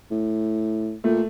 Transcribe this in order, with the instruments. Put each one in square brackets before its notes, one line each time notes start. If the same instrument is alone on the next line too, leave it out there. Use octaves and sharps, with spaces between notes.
[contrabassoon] A2
[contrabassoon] A#2 [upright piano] A3